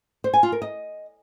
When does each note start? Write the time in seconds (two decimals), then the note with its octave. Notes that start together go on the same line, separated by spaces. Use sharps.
0.24 C5
0.34 G#5
0.43 F4
0.52 A#4
0.62 D#5